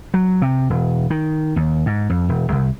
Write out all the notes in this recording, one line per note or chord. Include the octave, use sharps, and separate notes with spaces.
F#3
C3
E1
D#3
D#2
G#2
F2
E1
C2